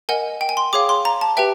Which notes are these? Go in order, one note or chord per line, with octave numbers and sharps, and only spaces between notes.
A#4 D#5 F#5 G#5
G5
G#5
C6
G#4 C#5 F5 D6
C6
A#5
A5
G4 B4 E5 G5